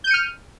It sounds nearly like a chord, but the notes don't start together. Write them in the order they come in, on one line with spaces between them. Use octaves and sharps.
G6 D#7 C#7 F6